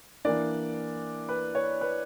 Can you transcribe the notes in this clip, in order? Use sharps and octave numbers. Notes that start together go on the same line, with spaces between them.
E3 A#3 D4 D5
B4
C#5
B4